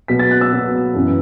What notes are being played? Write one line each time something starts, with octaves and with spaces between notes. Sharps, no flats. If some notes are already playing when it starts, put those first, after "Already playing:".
B2 F#3 B3 B6
A6
F#6
E6
B2 F#3 B3
F#2 E3 B3